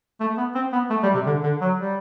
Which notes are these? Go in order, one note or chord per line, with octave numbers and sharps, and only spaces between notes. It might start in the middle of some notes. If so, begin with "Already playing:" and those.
A3
B3
C4
B3
A3
G3
C3
D3
D3
F#3
G3